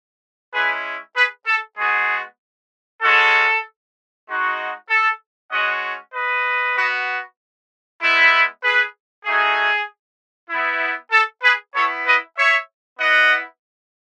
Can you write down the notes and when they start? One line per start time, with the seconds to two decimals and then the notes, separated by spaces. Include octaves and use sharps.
0.53 G#3 C#4 E4 G#4 B4
1.15 G#4 B4
1.46 A4
1.78 G#3 B3 F#4 G#4
3.02 G#3 C#4 F#4 A4
4.27 G#3 D#4 F#4
4.89 A4
5.51 G#3 C#4 F#4 D#5 F#5
6.13 B4 D#5
6.76 B3 F#4
8.01 G#3 B3 E4
8.62 G#4 B4
9.25 A3 D#4 F#4 G#4
10.49 B3 E4
11.12 A4
11.42 G#4 B4
11.74 B3 E4 A4 C#5
12.05 B4 D#5
12.36 C#5 E5
12.98 B3 E4 D#5 F#5